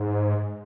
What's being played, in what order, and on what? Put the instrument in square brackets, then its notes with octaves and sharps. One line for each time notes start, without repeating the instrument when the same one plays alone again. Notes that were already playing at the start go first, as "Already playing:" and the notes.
Already playing: [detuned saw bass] G#2